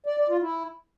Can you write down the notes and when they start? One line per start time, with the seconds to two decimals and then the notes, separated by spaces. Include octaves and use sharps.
0.06 D5
0.18 D5
0.30 F4
0.41 E4